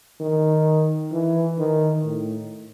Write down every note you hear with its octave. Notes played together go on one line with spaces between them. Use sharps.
D#3
E3
D#3
A2